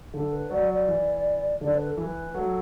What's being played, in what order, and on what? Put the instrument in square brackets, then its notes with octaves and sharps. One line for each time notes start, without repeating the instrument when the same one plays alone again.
[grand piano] D3 [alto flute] A4
[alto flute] B4
[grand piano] F#3 [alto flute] D5
[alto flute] D5
[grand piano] E3
[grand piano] D3 [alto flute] D5
[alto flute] B4
A4
[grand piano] E3 [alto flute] B4
[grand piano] F#3 [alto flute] A4